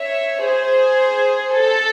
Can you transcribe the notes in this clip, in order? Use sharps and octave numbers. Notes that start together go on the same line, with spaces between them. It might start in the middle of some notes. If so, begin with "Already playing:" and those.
Already playing: C#5 E5
G#4 C5
A4